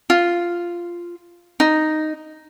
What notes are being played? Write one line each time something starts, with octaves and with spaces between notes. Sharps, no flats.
F4
D#4